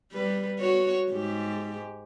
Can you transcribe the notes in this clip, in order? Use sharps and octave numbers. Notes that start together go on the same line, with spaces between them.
G3 B4
F#4 C#5
G#2 G4